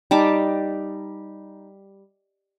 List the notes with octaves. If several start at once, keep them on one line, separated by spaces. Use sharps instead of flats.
G3 D#4 A5 D6